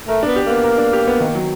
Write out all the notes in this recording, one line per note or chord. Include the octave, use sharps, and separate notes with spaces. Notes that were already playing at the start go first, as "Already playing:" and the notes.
A3 A#4
B3 D4
G4
A#3 B3
A#4
D4
G4
B3
D#3
F#3